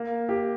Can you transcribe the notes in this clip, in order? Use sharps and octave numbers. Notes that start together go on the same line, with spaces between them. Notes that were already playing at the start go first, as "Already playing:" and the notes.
Already playing: A#3
G4